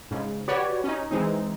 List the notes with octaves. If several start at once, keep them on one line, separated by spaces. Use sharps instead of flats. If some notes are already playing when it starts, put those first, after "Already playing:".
G#2 C#3
F#4 G4 B4 C#5 D5
C#4 D#4
E3 G#3 C4 D#4